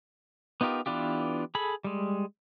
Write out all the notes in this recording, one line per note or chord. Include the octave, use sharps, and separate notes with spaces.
B3 D#4 F4 G4 A#4
E3 B3 D4 F4 G4
G#4 A4 B5
G3 G#3